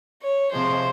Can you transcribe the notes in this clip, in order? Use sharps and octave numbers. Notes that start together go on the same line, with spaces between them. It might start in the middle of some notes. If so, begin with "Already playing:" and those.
C#5
C3 F3 G#3 C5